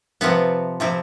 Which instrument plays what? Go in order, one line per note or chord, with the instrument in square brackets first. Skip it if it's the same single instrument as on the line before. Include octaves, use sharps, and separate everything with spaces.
[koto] C3 F3 B3 C4 E4 B4
C3 F3 C4 E4